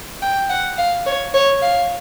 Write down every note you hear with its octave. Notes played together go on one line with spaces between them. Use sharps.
G5
F#5
F5
C#5
C#5
F5